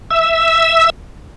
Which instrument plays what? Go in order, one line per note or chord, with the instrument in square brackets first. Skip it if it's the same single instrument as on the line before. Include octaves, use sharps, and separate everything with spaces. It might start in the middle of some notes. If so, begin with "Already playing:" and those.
[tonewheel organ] E5 E6